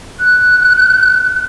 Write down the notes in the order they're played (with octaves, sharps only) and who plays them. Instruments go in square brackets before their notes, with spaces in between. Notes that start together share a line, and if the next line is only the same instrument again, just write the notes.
[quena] F#6